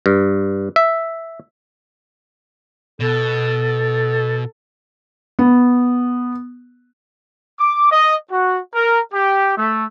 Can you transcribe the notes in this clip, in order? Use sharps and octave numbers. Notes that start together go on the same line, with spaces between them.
G2
E5
B2 A4
B3
D6
D#5
F#4
A#4
G4
A3